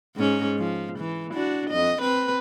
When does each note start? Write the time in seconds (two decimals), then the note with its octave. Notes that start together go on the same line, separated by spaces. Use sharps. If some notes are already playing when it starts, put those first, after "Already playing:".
0.17 G#2 C#4
0.59 F3
0.99 E3
1.34 D4 F#4
1.70 F2 D#5
2.02 C4 B4